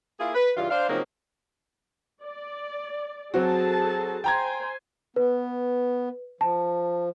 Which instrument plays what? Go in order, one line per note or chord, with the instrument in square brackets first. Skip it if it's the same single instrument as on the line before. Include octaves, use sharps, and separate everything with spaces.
[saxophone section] A#3 E4 F4 G#4
B4
G2 C#3 E3 F4
D4 C5 F5
C#3 F3 F#3 A#3 C4 D#4
[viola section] D5
[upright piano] F#3 C4 F#4 [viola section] G#4 A4 A5
[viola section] C5 G#5 [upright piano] G5 A#5 G#6
[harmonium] B3 [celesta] B4
[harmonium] F3 [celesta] A5